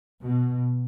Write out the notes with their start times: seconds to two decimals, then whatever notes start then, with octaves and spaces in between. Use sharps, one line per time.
0.21 B2